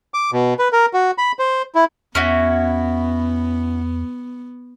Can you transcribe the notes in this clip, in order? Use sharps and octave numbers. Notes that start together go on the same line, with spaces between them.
D6
B2
B4
A#4
F#4
B5
C5
E4
E2 B3 C#4 E4 F#4